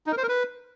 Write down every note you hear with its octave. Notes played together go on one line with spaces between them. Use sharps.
D#4
A#4
C5
A#4
B4